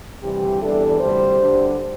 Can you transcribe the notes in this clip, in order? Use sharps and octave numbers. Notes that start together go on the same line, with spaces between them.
D2 C3 E3 G3 G4
E2 E3 G3 D4 E4 A4
D2 C3 G3 G4 C5
D2 D3 G3 D4